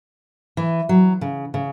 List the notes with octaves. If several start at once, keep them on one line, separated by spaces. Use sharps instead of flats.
E3
F#3
C#3
C#3